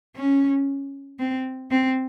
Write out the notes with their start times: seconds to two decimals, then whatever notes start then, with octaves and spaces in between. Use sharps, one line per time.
0.16 C#4
1.19 C4
1.71 C4